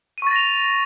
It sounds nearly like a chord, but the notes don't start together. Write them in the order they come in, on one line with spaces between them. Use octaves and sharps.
D#7 C#6 A6 A#6 F7